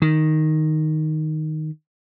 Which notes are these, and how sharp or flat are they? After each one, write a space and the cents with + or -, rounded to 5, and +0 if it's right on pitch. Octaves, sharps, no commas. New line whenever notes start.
D#3 +0